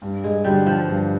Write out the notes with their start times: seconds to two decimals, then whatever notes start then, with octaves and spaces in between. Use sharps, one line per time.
0.02 G2
0.24 G#3
0.45 D3 F#3 G3
0.66 F3
0.88 G2